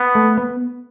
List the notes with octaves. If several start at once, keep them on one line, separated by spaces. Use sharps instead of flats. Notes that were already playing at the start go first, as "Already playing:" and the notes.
Already playing: B3
A3
B3